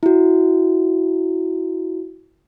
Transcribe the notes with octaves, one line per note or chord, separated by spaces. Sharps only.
E4 F#4